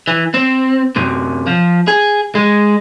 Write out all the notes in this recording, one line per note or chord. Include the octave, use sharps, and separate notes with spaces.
E3
C4
F#2 C3
F3
G#4
G#3